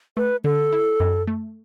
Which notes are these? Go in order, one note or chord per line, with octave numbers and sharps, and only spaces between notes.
A3 B4
D3 A4
E4
F#2
A3